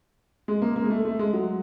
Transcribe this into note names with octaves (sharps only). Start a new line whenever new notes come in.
G#3
A#3
A#3
G#3
A3
A3
G#3
F#3